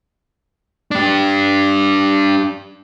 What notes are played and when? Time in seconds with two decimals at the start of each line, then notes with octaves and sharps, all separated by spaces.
0.91 D4 G4